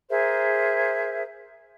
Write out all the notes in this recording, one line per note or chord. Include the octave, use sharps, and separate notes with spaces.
G#4 A#4 C5 E5